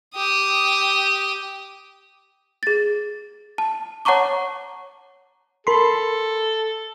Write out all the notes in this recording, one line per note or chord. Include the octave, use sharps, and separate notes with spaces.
G4 D#6
G#4 A6
A5
C#5 F#5 A5 A#5 C#6 D6
A4 A#4 B5 C6